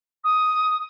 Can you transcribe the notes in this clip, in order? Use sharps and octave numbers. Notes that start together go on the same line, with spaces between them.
D#6